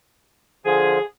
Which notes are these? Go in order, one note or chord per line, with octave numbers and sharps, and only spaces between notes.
D3 F3 G#4